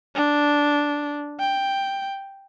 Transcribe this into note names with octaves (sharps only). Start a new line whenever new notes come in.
D4
G5